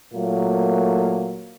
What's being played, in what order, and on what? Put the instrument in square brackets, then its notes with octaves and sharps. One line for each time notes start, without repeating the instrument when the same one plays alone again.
[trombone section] A#2 F#3 A3 A#3